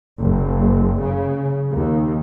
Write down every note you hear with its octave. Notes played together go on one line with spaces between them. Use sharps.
F#1
C#3
D#2